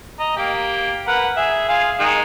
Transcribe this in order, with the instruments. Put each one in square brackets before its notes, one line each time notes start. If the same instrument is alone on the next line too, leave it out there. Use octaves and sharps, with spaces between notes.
[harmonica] D#5 A#5
A#3 G4 G5
A#4 B4 F#5
G#4 E5
F4 G#4 F5
D#3 G#3 D#4